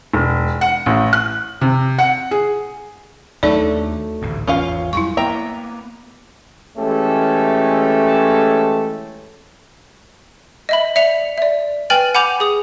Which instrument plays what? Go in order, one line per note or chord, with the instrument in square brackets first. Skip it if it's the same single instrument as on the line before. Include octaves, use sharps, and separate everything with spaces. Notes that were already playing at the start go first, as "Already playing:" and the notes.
[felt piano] E1
F#5
A1
F#6
C3
F#5
G#4
[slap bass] D#2 D4 [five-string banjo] F#3 A3 A4 [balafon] D#4 D5
[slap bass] A1 D2 G#2
[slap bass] G#1 E2 [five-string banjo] C#4 F4 F5
[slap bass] F2 F#3 G3 [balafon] E4 C#6
[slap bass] A#3 B3 [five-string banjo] E5 G5 A#5
[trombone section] E3 G#3 A3 C#4 G4 A4
[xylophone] D#5 E5 B5
D5 E5 C#7 F7
D5 E5
B4 G5 G#5 F6 A6 F#7
F#5 G#5 B5 D6 G6 F7
G#4 D#6